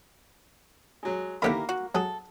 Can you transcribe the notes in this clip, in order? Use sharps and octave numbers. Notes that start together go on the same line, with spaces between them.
F#3 G#3
D#2 D3 A#3 E4 G4 A#4 B5
F#4
F#3 G#4 A4